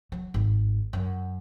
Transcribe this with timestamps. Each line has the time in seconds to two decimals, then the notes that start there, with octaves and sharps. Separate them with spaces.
0.12 F#3
0.34 G#1
0.93 F#2